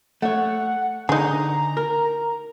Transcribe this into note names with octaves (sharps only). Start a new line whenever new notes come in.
A3 C#5 F#5
D3 D#4 G#4 A#5
A#4